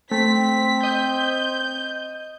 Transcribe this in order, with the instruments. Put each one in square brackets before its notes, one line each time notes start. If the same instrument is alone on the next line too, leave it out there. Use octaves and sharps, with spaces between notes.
[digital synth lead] A3 [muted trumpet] C4 [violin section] B6
[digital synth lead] D#5 [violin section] G6